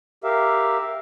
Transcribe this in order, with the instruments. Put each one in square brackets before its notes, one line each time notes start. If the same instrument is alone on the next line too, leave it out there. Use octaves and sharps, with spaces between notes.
[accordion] G4 A#4 E5 F5